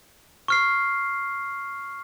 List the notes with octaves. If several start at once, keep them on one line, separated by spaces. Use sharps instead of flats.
C#6 F6 C7